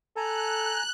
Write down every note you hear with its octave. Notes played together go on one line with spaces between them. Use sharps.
A4 G#5 A#5 F#6